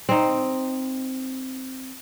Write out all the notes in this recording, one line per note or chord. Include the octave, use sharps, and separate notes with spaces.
C4 D#4